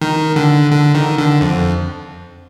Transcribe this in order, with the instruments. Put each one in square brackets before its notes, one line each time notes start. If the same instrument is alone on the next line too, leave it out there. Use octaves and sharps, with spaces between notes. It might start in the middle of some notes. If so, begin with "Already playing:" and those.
[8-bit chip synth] D#3
D3
D3
D#3
D3
F2